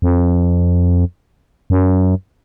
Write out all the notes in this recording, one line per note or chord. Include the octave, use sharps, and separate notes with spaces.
F2
F#2